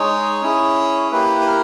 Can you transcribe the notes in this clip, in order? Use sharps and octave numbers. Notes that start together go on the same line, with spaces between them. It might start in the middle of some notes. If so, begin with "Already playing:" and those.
Already playing: G#3 D#4 G#4 C#5
C#4 E4 G#4
A#3 E4 G4 B4
B4
A#4